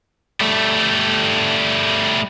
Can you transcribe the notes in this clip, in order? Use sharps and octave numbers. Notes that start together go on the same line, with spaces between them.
G3 A3